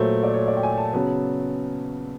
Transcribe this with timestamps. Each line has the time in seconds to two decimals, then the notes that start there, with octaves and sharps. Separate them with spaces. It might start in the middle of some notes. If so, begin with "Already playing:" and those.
Already playing: A#2 F#3 A3 C5
0.23 D5
0.34 C#5
0.48 D5
0.57 G5
0.63 G#5
0.78 A5
0.93 C#3 F#3 B3